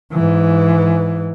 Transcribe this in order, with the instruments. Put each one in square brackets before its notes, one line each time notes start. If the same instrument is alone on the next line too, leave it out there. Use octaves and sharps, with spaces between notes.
[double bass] G#2 E3